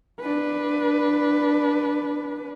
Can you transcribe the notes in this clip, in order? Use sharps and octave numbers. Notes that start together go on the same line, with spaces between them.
D4 B4